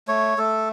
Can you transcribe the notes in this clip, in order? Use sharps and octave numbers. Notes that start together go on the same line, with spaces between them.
A3 C#5
A3 A4